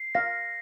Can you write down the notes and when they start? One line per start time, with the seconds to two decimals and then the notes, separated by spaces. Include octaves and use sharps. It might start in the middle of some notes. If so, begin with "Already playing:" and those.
Already playing: C7
0.15 F5 A#6